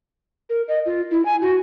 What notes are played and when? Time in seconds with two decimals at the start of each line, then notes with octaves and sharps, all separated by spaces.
0.50 A#4
0.68 D#5
0.86 F4
1.11 E4
1.25 G#5
1.41 F#4